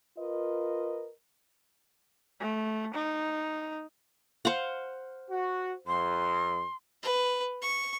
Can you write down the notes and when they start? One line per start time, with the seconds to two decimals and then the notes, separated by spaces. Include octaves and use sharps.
0.18 F4 A#4 B4 D#5
2.40 A3
2.94 D#4
4.45 C5 F5 F#5
5.31 F#4
5.87 F2 C6
7.03 B4
7.62 C#6